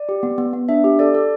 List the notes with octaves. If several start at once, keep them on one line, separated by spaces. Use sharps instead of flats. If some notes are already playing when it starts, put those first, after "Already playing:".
Already playing: D5
G4
B3
B3
B3
D4 E5
G4
A4 D5
A4